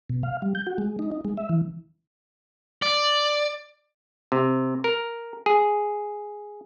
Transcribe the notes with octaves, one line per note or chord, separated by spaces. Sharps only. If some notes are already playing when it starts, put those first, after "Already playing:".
B2
F5
G3
G6
F#4
G#3
D#4
D#4
G#3
E5
E3
D5
C3
A#4
G#4